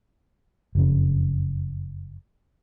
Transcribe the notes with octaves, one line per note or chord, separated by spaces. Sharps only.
F#1 F2 C#3